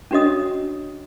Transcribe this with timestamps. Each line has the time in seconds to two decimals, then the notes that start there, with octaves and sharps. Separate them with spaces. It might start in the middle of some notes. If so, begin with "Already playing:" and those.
0.11 C#4 D4 F#4 C#5 D#5 D#6